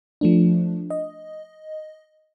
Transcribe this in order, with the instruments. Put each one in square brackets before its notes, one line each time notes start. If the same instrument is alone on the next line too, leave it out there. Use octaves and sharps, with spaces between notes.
[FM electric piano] F3 A3 D4
D#5